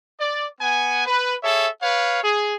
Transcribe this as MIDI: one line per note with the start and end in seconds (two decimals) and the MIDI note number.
0.20 0.46 74
0.61 1.03 59
0.61 1.03 78
0.61 1.03 80
1.06 1.34 71
1.43 1.67 68
1.43 1.67 69
1.43 1.67 73
1.43 1.67 76
1.82 2.22 71
1.82 2.22 73
1.82 2.22 77
2.22 2.55 68